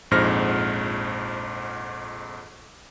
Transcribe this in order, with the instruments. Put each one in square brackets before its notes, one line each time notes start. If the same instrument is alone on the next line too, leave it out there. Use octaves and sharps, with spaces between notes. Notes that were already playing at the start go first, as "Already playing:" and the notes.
[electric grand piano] A#1 F2 G#2 C5 F6 A#6